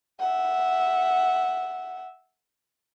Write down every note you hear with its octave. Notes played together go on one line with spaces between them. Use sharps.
E5 F#5